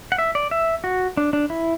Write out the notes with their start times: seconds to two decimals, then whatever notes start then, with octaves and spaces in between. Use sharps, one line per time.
0.12 F#5
0.19 E5
0.35 D5
0.51 E5
0.84 F#4
1.17 D4
1.33 D4
1.50 E4